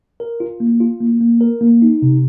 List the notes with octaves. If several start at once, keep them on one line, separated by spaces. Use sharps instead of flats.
A#4
F4
A#3
F4
A#3
A#3
A#4
A#3
D#4
C3